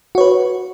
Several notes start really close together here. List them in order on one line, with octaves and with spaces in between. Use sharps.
F#4 C#5 B4